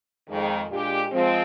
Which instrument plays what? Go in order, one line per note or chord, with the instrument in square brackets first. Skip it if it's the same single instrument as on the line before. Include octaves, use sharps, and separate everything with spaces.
[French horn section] F2 D#3 G#3
A#2 G#3 D4 G4
F3 G#3 C4